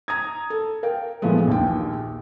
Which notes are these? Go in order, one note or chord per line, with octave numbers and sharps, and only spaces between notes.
A#5 D#6 G#6
A4
A#4 F5 G5
A#2 E3 F3 G#3 A3 B3
A#1 D#2 A#2 G5